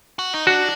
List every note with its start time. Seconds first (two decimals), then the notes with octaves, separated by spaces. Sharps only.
0.19 F#4
0.33 D#4
0.47 D4 F#4